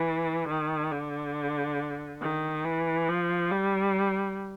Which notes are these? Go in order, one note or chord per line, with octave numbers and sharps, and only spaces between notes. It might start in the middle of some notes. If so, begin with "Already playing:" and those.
Already playing: E3
D#3
D3
D#3
E3
F3
G3